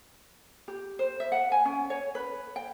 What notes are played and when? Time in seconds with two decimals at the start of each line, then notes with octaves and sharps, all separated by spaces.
0.68 G4
0.99 C5
1.20 E5
1.32 F#5
1.52 G#5
1.65 C#4
1.90 C#5
2.15 B4
2.56 G5